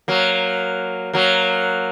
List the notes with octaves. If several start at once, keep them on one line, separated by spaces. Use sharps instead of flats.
F#3 A#3
F#3 A#3